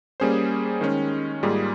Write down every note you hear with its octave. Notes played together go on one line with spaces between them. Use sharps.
G3 A#3 C#4 G#4 C5
D#3 G#3 C#4
G#2 G3 A#3 F4 G#4